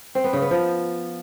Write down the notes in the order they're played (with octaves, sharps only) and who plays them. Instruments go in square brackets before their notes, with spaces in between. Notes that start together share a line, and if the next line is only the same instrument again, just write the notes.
[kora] C4
B3
C#3
B3
F3